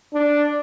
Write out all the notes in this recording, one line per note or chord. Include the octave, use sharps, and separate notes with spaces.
D4